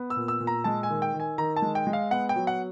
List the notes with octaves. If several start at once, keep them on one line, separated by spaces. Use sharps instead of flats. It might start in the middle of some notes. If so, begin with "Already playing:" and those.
Already playing: B3
E6
A#2
E6
A#2
A#5
G#3 A5
G#5
D#3
G5
D#3
G#5
D#3 A#5
A5
G#3
G5
G#3
F5
B3 F#5
G5
F#3
F#5